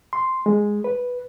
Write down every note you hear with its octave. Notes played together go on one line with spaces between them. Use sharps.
C6
G#3
B4